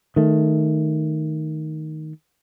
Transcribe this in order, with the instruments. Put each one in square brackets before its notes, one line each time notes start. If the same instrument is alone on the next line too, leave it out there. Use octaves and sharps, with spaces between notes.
[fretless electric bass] D#3 A3